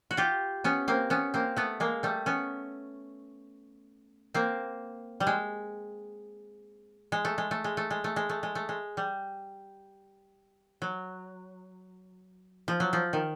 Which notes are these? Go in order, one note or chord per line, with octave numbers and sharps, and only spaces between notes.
F#4
F4 G4
B3 C#4
A#3 C4
B3 C#4
A#3 C4
A3 B3
G#3 A#3
G3 A3
B3 C#4
A#3 C4
G3
G#3
G#3
A3
G#3
A3
G#3
A3
G#3
A3
G#3
A3
G#3
A3
G#3
G3
F#3
F3
F#3
F3
D#3